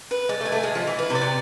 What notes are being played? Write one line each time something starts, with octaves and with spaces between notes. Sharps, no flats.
B4
G#3 D5
A3
G#5
A3
G#3 G#4
F3
E4
E3
B4
C3
D5
C3